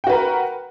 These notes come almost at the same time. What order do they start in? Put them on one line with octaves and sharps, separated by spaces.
G5 F#4 B4 A#4